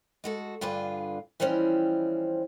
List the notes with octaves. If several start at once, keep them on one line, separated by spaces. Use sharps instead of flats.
G#3 F#4 A4
G2 D3 F4 G#4 B4
E3 F3 G3 C4 C#4